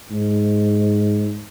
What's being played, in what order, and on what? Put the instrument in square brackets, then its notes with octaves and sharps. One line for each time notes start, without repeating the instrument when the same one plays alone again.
[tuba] G#2